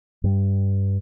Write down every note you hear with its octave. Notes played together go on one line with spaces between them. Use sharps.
G2 G3